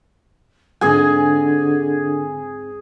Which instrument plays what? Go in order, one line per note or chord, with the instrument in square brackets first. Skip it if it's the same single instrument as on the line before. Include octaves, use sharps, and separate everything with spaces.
[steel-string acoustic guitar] G#2 C4 [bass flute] D3 [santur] G#4 G#5